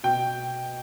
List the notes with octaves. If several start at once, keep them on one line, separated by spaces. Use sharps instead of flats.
B2 G5